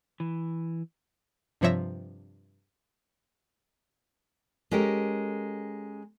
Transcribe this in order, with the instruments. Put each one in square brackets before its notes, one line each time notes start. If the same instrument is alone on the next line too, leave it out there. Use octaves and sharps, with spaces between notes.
[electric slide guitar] E3
[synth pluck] G2 C3 F3 C#5 E5 A#6
[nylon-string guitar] G#3 C#4 G4 A4 A#4